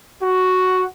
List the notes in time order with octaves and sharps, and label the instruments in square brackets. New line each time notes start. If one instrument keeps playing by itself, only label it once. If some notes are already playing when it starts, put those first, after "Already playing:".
[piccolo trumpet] F#4